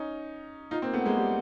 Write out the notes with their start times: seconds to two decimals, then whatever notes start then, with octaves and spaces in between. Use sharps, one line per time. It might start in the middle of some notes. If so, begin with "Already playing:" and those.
Already playing: C#4 D#4
0.71 D#4 F4
0.82 A#3 C4
0.93 A3 B3
1.05 G#3 A#3
1.17 G3